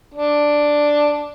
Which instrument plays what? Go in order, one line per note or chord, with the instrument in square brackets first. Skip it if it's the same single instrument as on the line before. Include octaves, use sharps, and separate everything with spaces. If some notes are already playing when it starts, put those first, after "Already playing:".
[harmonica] D4